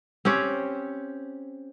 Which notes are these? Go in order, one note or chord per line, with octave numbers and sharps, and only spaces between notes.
C4 C#4 G4 C#5